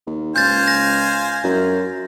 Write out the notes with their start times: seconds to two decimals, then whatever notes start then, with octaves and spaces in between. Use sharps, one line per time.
0.07 D#2
0.36 C#2 C5 F5 G#5 G6 A6
0.68 A#6
1.44 F#2